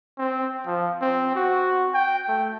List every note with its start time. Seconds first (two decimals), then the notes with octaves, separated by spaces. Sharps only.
0.19 C4
0.66 F3
1.01 C4
1.35 F#4
1.94 G5
2.28 A3